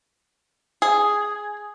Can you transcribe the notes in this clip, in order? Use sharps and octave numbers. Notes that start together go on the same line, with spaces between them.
G#4